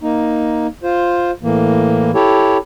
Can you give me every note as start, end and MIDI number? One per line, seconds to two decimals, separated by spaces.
0.01 0.67 58
0.01 0.67 63
0.83 1.31 65
0.83 1.31 72
1.43 2.11 45
1.43 2.11 52
1.43 2.11 58
2.15 2.57 64
2.15 2.57 67
2.15 2.57 69
2.15 2.57 73